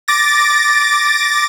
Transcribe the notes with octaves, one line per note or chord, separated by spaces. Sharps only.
D6 A6 A#6